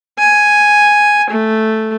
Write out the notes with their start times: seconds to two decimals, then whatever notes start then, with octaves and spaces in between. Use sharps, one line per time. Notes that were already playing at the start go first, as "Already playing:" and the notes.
0.19 G#5
1.30 A3